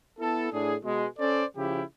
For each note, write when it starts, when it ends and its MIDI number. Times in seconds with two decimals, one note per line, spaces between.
0.19 0.48 59
0.19 0.48 64
0.19 0.48 69
0.53 0.75 45
0.53 0.75 62
0.53 0.75 68
0.83 1.07 47
0.83 1.07 56
1.19 1.44 61
1.19 1.44 69
1.19 1.44 72
1.19 1.44 74
1.57 1.83 49
1.57 1.83 53
1.57 1.83 64
1.57 1.83 67